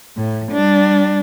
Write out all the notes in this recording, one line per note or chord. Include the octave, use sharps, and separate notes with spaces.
A2
G3 D4